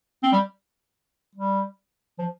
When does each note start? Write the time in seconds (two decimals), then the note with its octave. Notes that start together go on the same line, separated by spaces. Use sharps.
0.23 C4
0.32 G3
1.35 G3
2.19 F3